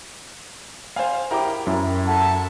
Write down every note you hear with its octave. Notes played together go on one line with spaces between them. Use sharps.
C5 F5 G#5
E4 G4 A#4 G5 A#5 D6
F#2 E4
A4 E5 F#5 A5